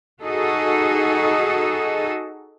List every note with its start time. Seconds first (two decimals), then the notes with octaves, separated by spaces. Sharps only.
0.22 D#4 F#4 G#4 A4 D#5